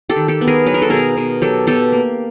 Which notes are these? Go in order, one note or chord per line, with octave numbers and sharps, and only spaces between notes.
G4 A4
D#3
G4 A4
B3
G#4 A#4
F#3 B4
A#4
A4
B2 G#4 A#4
B2
F#3 G4 A4
B2 G4 A4
A#3